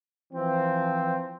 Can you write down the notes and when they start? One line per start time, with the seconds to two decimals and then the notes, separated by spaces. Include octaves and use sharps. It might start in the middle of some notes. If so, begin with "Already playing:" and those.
0.33 E3 F3 C4